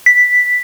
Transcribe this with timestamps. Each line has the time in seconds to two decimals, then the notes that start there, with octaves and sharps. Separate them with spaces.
0.06 B6